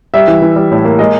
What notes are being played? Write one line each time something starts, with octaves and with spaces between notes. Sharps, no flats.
G3 E5
E3
E3
G3
A2
A#3
G#3 D#5